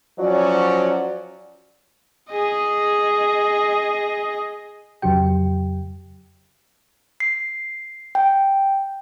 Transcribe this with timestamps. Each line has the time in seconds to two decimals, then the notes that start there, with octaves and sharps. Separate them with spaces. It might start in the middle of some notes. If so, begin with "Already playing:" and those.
0.19 F3 F#3 C#4 F#4 D5
2.32 G#4 D#5
5.02 F2 C#3 F#3 G4 G5
7.20 C7
8.15 G5